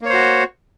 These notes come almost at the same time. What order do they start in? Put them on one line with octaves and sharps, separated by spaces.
A#3 C#5 C5 F#4